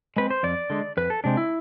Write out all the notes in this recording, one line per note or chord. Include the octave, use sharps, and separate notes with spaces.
G#3 C4 B4
C5
F2 D5
D3 G#3
F2 B4
A4
C3 G#3 C4 D4
E4